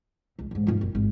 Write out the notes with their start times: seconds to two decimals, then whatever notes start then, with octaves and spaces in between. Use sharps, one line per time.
0.39 C#2
0.51 A1 G#2
0.67 G#2 F4
0.81 F#1
0.95 G#1